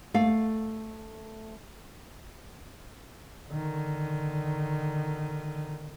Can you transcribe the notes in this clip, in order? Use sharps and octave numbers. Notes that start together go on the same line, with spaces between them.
A3 F5
D3 D#3